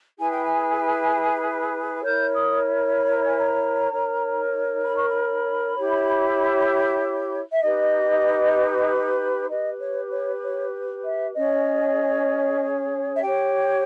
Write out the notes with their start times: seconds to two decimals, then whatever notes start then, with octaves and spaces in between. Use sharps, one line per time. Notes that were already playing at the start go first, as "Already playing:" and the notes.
0.17 E4 G#4 B4 G#5
0.31 G5
0.44 G#5
2.03 E4 A#4 C#5 G6
2.35 D#6
2.97 B5
3.10 A#5
3.24 G#5
3.37 A#5
3.90 D#4 A#4 C#5
4.83 B5
4.96 C#6
5.08 B5
5.76 E4 G4 C#5
7.52 E5
7.62 D#4 G4 B4 D#5
9.49 G4 B4 D#5
9.80 C#5
10.11 C#5
10.42 C#5
11.04 E5
11.35 C#4 G#4 C#5 D#5
13.16 E5
13.21 G4 C#5 G5